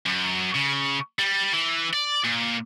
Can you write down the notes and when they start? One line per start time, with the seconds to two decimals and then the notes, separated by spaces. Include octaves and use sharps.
0.06 F#2
0.54 C#3
1.19 G3
1.53 E3
1.93 D5
2.24 A#2